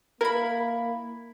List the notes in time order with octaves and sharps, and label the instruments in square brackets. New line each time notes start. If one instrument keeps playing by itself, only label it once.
[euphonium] A#3 [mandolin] E4 B5 [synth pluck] A#4